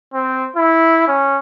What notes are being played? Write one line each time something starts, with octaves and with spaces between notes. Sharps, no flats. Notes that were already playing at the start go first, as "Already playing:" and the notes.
C4
E4
C#4